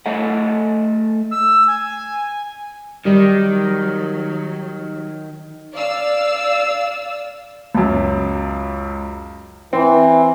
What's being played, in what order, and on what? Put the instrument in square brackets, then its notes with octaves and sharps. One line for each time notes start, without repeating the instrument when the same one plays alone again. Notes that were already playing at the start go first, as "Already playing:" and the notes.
[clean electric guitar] A3 A4 D#5 F#5
[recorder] E6
G#5
[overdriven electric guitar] D#3 [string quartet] F#3 [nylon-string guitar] G3
[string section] D5 F5 E6
[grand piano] C#2 F#2
[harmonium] E3 [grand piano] C4